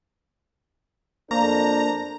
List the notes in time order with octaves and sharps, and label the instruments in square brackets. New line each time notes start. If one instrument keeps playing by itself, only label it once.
[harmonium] F2 A#4 C5 [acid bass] A#3 [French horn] D4 [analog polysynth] A#5